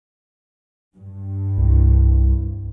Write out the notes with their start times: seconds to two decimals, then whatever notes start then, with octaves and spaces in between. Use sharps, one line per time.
0.97 G2
1.57 C2